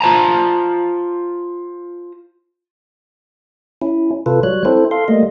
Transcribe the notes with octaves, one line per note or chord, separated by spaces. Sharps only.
F4 C5 A5 A#5
C#4 E4
C3 F4 A4 B4
F#3 G3 C#5 F#6
C4 E4 A4 C5
A4 F5 C6
G3 A3 A#3 D#5